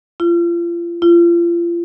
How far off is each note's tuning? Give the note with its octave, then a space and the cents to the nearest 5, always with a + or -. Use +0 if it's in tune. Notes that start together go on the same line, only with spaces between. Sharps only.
F4 -35
F4 -35